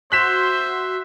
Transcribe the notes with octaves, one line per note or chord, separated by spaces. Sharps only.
F#4 C5 E5 C6 F#6 B6 E7